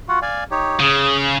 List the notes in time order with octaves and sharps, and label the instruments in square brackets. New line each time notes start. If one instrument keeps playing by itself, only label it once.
[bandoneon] F4 F#4 F#5
D5 F5 G#5
D#4 G4 C#5
[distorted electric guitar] C#3 [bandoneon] G#4